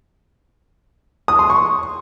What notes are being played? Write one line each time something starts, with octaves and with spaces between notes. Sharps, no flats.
D#6
C6
C#6